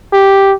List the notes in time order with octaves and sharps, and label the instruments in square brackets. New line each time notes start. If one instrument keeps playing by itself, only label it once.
[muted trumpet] G4